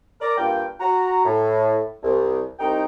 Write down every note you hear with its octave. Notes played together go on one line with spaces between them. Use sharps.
A#4 D5 A#5
G2 A#3 F4 G5
F#4 A#5
A2
C2
C2 D#4 G5